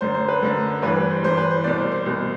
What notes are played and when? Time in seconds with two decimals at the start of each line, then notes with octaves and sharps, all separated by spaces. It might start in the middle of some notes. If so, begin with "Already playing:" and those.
0.01 F#2 D3 C5
0.14 C5
0.28 B4
0.42 F#2 D3 A4
0.82 G2 E3 B4
0.97 B4
1.11 C5
1.23 G2 E3 C5
1.37 B4
1.51 C5
1.64 C2 B2 D5
1.78 C5
1.92 C5
2.06 C2 B2